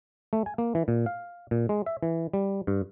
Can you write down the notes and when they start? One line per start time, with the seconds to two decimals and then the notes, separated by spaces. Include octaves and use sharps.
0.33 A3
0.46 G#5
0.58 A#3
0.75 E3
0.88 A#2
1.06 F5
1.51 A#2
1.69 G#3
1.86 E5
2.03 E3
2.33 G3
2.67 G2